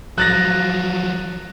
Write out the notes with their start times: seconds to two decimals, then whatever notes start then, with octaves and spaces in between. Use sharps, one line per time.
0.18 F3 F#3 F#6 A6 A#6